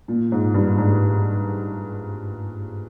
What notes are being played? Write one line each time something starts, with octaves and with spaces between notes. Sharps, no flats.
A#2
G#2
G2
G#2